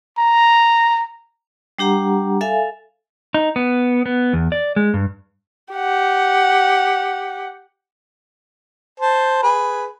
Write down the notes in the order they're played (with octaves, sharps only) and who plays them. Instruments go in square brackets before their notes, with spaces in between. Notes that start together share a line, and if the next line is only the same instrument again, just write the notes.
[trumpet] A#5
[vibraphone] G3 D4 G4 F#5 A#5
A4 E5 F5 G#5
[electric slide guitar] D#4
B3
B3
E2
D5
G#3
G2
[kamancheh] G4 F#5
[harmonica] C5 A5
G#4 B4